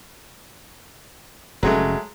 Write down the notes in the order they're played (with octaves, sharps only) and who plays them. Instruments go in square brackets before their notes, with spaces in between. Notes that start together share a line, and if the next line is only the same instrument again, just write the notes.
[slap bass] F1 G#2 C#4 [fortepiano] F#3 G#3 A3